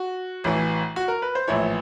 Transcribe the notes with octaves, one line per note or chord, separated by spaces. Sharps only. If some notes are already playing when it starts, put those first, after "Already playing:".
Already playing: F#4
A1 A2 E3
F#4
A#4
B4
C5
A#1 A2 E3 C#5